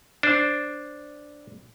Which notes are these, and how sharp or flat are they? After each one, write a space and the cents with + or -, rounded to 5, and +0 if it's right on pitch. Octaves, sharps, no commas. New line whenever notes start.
D4 +0 C5 +0